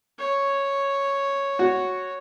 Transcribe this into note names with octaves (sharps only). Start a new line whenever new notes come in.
C#5
F#4